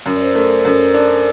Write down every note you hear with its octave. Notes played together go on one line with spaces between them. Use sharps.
F#2 A#4
D5
C5
A3 A#4
C5
A#4
F#2 A4
A#4
D4